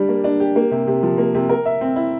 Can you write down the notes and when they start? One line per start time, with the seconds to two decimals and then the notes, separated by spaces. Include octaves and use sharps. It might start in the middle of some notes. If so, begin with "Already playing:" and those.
Already playing: G3 D4 G4
0.09 A#3
0.24 D4
0.40 G4
0.56 A#3
0.71 C3
0.87 C3
1.03 F3
1.18 A#3
1.34 C3
1.49 A#4
1.66 E5
1.81 C4
1.96 E4